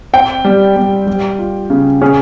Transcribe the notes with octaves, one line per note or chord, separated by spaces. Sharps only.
C4 G5
G3
G3
G3
F4
C#3
C#4 G#4